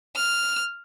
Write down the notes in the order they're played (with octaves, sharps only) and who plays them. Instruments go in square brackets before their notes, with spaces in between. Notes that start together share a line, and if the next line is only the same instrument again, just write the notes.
[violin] F6